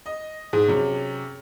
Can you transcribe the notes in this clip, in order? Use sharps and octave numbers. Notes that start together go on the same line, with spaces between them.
D#5
G#2 G#4
F#2 C3